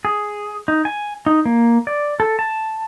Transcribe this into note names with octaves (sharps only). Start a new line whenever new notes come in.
G#4
D#4
G#5
D#4
A#3
D5
A4
A5